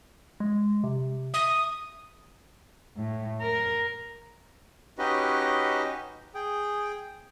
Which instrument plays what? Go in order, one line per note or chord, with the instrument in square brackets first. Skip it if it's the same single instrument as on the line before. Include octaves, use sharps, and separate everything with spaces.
[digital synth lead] G#3
C3
[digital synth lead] E5 [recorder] D#6
[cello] A2
A#4
[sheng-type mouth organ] C#4 D#4 F#4 G4 B4 D#5
G#4 G5